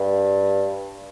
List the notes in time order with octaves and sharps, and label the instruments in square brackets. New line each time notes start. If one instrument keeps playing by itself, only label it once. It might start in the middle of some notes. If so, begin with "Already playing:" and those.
Already playing: [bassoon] G2